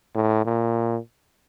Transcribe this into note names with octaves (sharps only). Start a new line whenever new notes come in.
A2
A#2